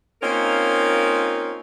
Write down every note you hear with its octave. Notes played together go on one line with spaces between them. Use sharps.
A#3 C4 C#4 D#4 F4 A#4